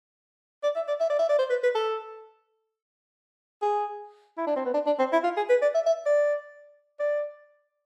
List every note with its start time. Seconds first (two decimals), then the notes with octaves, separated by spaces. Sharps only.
0.63 D5
0.75 E5
0.88 D5
1.00 E5
1.09 D5
1.19 E5
1.29 D5
1.38 C5
1.50 B4
1.63 B4
1.75 A4
3.62 G#4
4.37 E4
4.46 D4
4.56 C4
4.65 B3
4.74 D4
4.86 D4
4.99 C4
5.12 E4
5.24 F4
5.37 G#4
5.49 B4
5.62 D5
5.74 E5
5.86 E5
6.06 D5
6.99 D5